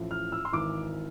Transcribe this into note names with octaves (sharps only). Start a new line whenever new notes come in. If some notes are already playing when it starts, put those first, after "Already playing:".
Already playing: A1 A2 F3
F6
E6
C6
G#1 G#2 E3 D6